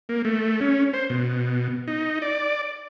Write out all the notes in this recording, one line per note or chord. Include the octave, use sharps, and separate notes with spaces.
A#3
A3
C#4
C5
B2
D#4
D5